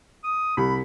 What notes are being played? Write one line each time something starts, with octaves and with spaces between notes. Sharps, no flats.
D#6
C2 B5